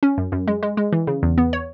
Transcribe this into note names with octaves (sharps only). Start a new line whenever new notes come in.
C#4
F#2
F#2
G#3
G#3
G#3
E3
C#3
E2
B3
C#5